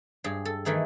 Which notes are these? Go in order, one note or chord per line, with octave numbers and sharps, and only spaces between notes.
G2 G4 G#4
A4
D#3 E3 A3 D#4 G#4